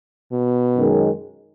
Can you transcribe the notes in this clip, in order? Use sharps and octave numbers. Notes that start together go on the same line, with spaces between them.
B2
F#2 D#3 G#3